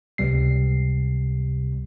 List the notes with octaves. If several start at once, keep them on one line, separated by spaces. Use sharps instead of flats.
C#2 C3 G3 C7